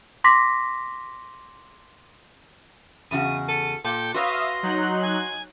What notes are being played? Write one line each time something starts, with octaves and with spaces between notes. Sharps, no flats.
C6 D6 A#6 B6
E2 C#3 F#4 D#7
A4 D#7
A#2 A4 G5
F#4 B4 C#5 E5 F5 C6 D#6 A#6
F#3 D#4 F#6
G#5